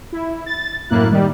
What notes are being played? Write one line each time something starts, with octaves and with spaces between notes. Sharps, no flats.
E4
A6
F#2 A2 A#3 E4 F#6
D#3 G3